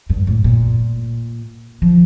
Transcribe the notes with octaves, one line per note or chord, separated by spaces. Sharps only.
G2
A2
A#2
F3